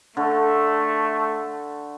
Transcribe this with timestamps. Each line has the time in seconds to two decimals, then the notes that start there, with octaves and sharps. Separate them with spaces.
0.17 D3 A3